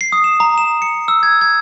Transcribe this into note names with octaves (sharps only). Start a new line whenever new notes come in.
C7
D#6
E7
A#5
E7
C#7
E6
G#6
G#6